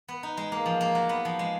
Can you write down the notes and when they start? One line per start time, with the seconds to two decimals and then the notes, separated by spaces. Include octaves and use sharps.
0.08 B3
0.23 D#4
0.37 G#3
0.52 A#3
0.66 F3
0.81 A#3
0.95 F#3
1.09 B3
1.25 F3
1.39 G#3